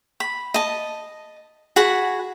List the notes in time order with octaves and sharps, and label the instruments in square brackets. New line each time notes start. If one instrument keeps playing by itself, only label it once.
[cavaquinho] B5
D#5 A5
F#4 G#4 F#5 B5